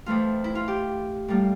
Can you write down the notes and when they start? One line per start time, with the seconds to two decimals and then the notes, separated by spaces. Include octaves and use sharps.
0.06 F2 E3 A3 F4
0.44 E4
0.55 F4
0.68 G4
1.28 A2 G3 A#3